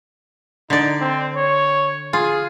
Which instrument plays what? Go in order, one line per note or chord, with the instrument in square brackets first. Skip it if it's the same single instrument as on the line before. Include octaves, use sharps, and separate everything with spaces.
[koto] D3 D5 [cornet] D#4
[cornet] C4
C#5
[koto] F4 [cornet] G#4